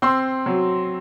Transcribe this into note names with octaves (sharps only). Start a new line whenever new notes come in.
C4 C6 E6
F#3